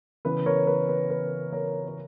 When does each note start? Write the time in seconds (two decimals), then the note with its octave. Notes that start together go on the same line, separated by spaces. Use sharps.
0.25 C#3 E3 B3 B4
0.46 A#4 C#5
0.67 B4
0.89 B4
1.10 B4
1.53 A#4 C#5
1.88 C#5